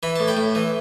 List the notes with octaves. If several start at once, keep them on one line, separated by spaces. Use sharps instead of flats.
E3 B5
A2 A5
G5 B5
A2
E3